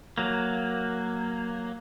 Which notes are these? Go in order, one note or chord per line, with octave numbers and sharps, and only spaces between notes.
F#3 A#3